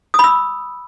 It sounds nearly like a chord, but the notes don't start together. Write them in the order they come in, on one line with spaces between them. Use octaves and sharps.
D#6 B5 E6